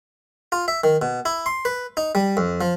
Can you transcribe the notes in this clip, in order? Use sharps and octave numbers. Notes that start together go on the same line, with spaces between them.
F4
E5
D#3
B2
E4
C6
B4
D#4
G3
F2
F3